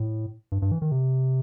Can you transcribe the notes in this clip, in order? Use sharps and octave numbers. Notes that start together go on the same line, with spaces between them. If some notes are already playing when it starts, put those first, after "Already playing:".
Already playing: A2
G2
G2
E3
D#3
C3